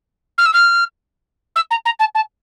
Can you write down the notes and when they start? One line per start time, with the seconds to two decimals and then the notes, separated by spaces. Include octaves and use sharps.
0.38 F6
0.46 E6
0.54 F6
1.56 E6
1.71 A#5
1.86 A#5
2.00 A5
2.15 A5